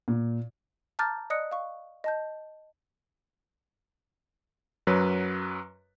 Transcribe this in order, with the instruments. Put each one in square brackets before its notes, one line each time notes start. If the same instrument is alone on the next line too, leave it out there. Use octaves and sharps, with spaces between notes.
[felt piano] A#2
[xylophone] A5 A#5 D6 F6 G6 A6
D5 D#5 D#6 F#6 C#7
F5 C#6
D#5 A5 G6
[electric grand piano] F#2 F#3 B4